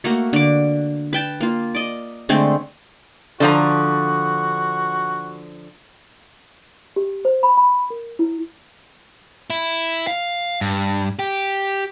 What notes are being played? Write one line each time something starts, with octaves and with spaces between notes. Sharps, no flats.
A3 A#3 F#4
D3 D6
B4 G5 A5
A#3 F4
D5 D#5
D3 G#3 A3 C4
D3 F3 F#4 A#5
G4
C5
B5
B5
A#4
E4
E4
F5
G2
G4